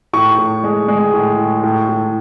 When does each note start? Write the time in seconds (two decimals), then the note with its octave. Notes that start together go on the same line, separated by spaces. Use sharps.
0.13 A2 C#6
0.38 A2
0.64 G#3
0.88 G#3
1.14 A2
1.39 A2
1.64 A2
1.89 A2